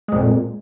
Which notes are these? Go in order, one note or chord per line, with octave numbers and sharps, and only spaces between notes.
F2 A#2 G#3